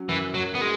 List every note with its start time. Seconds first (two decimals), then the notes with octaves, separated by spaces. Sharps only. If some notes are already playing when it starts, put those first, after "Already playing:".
Already playing: F#3 C#4
0.08 F#2 E3
0.34 F#2 F#3
0.55 B3
0.61 G#3